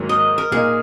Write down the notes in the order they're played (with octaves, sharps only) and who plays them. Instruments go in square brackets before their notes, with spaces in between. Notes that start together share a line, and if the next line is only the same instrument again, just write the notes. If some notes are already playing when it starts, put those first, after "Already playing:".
Already playing: [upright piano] G#2 D#3 F#3 A#3
[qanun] D#5
A#4
[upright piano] A#2 A#3 D#4 [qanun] G#4